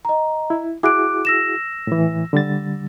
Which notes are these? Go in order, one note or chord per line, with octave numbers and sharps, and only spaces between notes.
D#5 A#5
E4
E4 F#4 G#4 D6 F#6 D7
E6 A#6 E7
A2 E3
D3 G3 A6